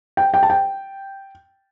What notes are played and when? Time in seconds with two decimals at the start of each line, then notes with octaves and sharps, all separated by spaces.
0.17 G5
0.34 G5
0.43 A5
0.50 G5